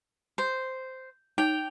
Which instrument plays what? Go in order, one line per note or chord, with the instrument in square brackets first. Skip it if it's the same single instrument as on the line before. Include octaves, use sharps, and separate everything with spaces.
[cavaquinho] C5
[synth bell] D#4 F7 G7 [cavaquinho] G5